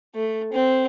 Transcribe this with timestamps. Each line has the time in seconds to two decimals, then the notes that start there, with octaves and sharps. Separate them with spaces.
0.16 A3
0.53 C4